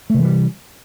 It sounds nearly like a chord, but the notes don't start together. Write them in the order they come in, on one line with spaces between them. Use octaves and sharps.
A3 C3 E3 G3